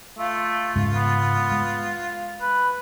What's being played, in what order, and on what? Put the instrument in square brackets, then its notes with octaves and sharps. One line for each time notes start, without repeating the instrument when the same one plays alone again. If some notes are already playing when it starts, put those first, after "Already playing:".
[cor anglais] A3 [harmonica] F4
[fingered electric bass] G#2 C#3 G#3
[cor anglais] B3
[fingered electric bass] G#3
[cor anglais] B4